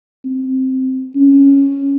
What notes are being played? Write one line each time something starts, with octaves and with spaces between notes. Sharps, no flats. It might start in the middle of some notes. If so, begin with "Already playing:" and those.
C4
C#4